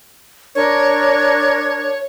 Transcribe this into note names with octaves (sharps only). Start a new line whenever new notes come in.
D4 A#4 C#5 G#6